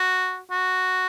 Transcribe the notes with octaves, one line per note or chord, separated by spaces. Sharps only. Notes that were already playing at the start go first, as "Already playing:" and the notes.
Already playing: F#4
F#4